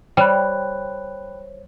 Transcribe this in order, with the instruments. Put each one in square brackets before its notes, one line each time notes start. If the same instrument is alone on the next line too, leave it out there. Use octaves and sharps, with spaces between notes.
[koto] G3 [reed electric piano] C5 C#5 [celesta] G5 B5 F#6